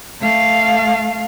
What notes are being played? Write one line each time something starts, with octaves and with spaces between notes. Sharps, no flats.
A3 F5